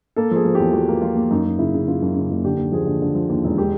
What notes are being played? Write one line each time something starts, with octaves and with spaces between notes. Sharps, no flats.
A#3 A4
F3 G#4
F3
E2 G4
F3 F#4
A#3
F3 F4
A#3
F#2 D#4
F#2
C#3 E4
C#3
C#3 F4
F#2
C#3
F#1
D3 G4
D#2
F3 G#4
D3
D3
F3
D#2
E1
G#3 G4